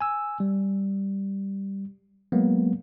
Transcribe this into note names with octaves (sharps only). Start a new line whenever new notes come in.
G#5 E6
G3
F#3 G#3 A#3 B3